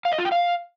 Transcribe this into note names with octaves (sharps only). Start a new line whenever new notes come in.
F5
D#5
F4
G5
F5